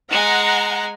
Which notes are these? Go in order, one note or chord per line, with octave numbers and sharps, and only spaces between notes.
G#3 F#5 G#5 A#5